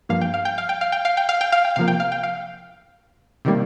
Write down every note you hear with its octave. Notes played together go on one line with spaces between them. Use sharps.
G2 F3 A#3 F5
G5
F5
G5
F5
G5
F5
G5
F5
G5
F5
G5
F5
G5
C3 F3 A#3 F5
G5
F5
G5
F5
C3 D#3 G3 A#3